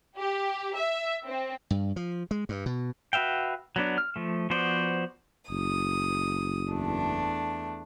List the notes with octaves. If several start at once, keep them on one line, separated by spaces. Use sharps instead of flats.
G4
E5
C4
G2
F3
G#3
G2
B2
F#4 B4 E5 F5 G5
F#3 B3 D4
F6
F3 A3
F3 B3 F#4 C5 D5
F#1 D#6
E2 A3 D4